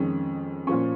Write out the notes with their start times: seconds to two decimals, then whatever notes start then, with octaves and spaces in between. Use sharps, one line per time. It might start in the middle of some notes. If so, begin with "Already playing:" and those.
Already playing: F2 D#3 G#3 C#4
0.67 A#2 F3 C#4 C#6